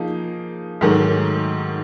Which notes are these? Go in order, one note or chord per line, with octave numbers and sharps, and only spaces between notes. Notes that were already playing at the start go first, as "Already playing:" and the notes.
Already playing: F3 A#3 D#4 G#4
G#2 D#3 F#3 A3